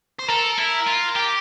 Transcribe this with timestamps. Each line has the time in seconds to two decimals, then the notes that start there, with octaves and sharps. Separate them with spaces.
0.19 C5
0.29 A4 A#4
0.58 E4
0.87 F4
1.16 G4